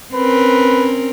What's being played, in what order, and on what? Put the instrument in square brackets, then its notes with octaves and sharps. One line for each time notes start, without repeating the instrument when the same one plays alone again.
[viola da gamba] C4 C#4 A#4 [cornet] B4